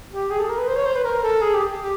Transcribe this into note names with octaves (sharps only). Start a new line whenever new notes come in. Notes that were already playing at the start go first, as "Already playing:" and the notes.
G4
G#4
A4
A#4
B4
C5
C#5
C5
B4
A#4
A4
G#4
G4
G4